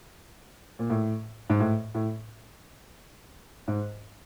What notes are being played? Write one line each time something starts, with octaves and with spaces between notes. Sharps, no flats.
A#2
A2
G#2
A2
A2
G#2